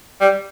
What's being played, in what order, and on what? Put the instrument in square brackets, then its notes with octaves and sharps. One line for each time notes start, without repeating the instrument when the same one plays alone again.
[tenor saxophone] G3